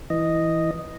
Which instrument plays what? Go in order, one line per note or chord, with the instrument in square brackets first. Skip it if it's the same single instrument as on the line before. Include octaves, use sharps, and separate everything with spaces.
[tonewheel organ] E3 D#5